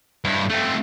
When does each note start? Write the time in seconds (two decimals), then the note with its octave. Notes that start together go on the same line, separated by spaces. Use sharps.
0.25 G2 E4
0.49 A3 C4